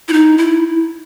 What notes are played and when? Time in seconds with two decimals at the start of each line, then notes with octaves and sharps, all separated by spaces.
0.08 E4
0.13 D#4
0.38 E4